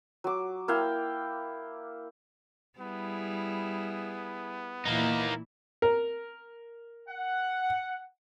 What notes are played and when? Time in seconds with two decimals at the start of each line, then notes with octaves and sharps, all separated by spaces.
0.24 F#3 D6
0.68 A#3 E4 F5 G5
2.79 G3 B3 E4 G#4
4.85 A#2 E3 A#3 D#4 E4
5.82 A#4
7.09 F#5